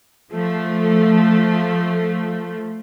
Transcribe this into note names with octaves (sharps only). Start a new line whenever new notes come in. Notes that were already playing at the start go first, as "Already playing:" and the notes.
F3 A3